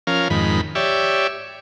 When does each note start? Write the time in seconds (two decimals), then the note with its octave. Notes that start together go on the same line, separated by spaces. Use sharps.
0.07 F3 C#4 A#4 F5
0.30 F2 G#2 D#3 B5
0.75 G4 C#5 D5 E5